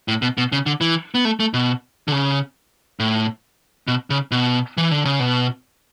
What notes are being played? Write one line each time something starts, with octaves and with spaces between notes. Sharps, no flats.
A2
B2
B2
C#3
D3
E3
B3
A3
A3
B2
D3
C#3
A2
B2
C#3
B2
E3
D3
C#3
B2